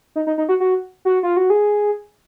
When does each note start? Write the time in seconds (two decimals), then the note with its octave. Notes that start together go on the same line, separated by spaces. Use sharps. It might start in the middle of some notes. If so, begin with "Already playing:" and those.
0.16 D#4
0.27 D#4
0.38 D#4
0.49 F#4
0.60 F#4
1.05 F#4
1.23 F4
1.37 F#4
1.50 G#4